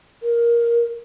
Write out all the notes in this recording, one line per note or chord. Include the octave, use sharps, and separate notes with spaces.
A#4